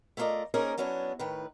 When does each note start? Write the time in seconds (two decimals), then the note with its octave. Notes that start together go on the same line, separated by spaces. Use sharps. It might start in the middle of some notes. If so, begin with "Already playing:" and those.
0.17 A3 E4 F4 A#4 D5 D#5
0.54 A#3 C#4 D#4 G#4 A#4 C5
0.78 F#3 B3 C#4 D4 E4
1.19 A2 D#3 B4